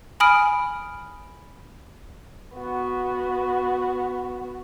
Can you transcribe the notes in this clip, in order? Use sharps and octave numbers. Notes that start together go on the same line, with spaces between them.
G#5 B5 D#6 F6 D7
B3 F#4